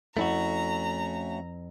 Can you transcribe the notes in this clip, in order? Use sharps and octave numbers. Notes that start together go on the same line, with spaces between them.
F2 A3 C#4 E4 F#4 F#5 A#5